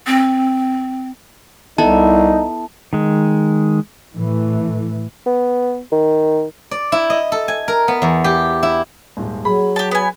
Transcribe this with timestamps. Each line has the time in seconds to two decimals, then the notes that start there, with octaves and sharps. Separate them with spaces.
0.07 C4
1.78 C2 B3 D#4 E4 A4 A5
2.93 D#3 G#3
4.14 A2 E3 A3
5.26 B3
5.92 D#3
6.71 D5
6.92 E4
7.10 D#5
7.32 A4
7.48 G#5
7.68 A#4
7.88 B3
8.02 E2
8.24 G4
8.63 E4
9.17 D#1 G#2
9.45 F#3 G#4 B5
9.76 G4 A5
9.91 B3 G#5